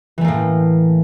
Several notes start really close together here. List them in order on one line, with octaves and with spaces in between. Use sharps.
E3 A3 A#3 A2